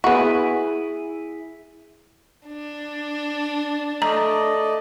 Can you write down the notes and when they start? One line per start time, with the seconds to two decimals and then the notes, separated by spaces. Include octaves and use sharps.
0.04 B3 E4 F#4 G#4
2.47 D4
4.02 A3 D5 D#5 A#5